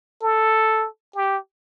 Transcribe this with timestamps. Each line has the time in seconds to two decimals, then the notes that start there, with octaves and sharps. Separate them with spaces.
0.22 A4
1.15 G4